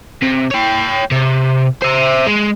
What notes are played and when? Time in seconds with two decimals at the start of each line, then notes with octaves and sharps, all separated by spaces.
0.22 C3
0.51 C#5 G5
1.11 C3
1.82 C5 E5
2.27 G#3